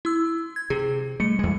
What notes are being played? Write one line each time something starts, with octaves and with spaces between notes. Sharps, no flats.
E4 E6
G#6
C3 G#4
G3 A3 C#7
E2 G#3